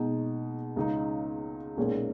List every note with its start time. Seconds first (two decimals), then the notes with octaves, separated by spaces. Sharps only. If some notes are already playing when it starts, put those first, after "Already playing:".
Already playing: B2 G#3 D#4
0.76 C#2 C#3 G#3 D#4
1.77 B1 A#2 G#3 C#4 G#4